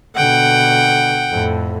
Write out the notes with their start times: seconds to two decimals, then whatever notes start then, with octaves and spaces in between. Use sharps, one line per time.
0.16 B2 D3 F#5 G5
1.30 F2 A2